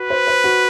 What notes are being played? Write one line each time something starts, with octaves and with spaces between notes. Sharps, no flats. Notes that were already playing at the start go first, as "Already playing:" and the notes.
Already playing: F#4 B4
C5
C5
F#4